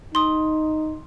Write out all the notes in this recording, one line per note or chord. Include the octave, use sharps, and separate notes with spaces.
D#4 C6 D#6